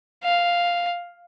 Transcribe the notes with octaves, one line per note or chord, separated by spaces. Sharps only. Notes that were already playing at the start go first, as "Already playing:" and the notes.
F5